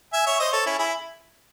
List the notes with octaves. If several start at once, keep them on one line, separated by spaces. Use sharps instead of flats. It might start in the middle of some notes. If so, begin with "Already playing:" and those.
E5 G#5
C#5 E5
C5 D#5
A4 C#5
C#4 E4
E4 G#4